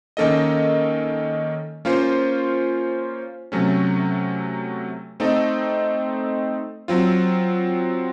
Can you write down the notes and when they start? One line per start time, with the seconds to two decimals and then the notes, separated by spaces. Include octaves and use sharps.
0.17 D#3 A#3 C#4 A4 D#5
1.85 A#3 C#4 F4 C5
3.52 C3 F#3 A3 C#4
5.20 A3 C4 D#4 A4 D#5
6.88 F#3 C4 F4